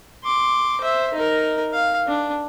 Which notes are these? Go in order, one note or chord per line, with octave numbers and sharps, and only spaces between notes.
C6 D6
C5 E5
D#4 A#4
F5
D4